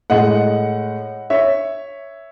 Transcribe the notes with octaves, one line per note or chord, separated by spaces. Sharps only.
A2 G#3 D#5 F#5
C#5 E5